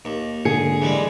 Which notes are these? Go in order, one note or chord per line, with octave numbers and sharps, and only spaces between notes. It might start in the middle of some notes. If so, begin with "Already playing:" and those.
D#2
G#2 D3 G#4 C#7
E3 G3 G#3